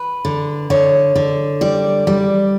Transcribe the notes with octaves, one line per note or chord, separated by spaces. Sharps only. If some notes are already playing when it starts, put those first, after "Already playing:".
Already playing: B4
D3
D3 C#5
D3
G3 D5
G3